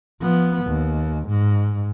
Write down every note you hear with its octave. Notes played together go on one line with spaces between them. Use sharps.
F3 B3
D#2
G#2